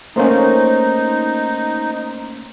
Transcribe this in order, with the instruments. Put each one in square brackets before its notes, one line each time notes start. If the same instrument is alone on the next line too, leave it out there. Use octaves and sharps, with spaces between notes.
[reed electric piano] A3 A#3 C#4 [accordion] D#4 [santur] C5